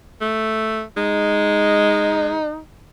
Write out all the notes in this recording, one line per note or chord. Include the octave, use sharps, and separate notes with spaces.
A3
G#3 D#4